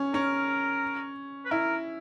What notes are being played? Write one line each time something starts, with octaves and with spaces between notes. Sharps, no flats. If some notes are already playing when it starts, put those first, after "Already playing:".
Already playing: C#4
C#4 A#4
B4
E4 A#4